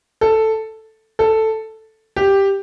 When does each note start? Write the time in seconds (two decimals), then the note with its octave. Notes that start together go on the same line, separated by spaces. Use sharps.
0.21 A4
1.19 A4
2.16 G4